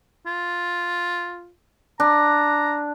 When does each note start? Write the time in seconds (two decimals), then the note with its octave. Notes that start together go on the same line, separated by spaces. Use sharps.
0.26 F4
2.00 D4 A#5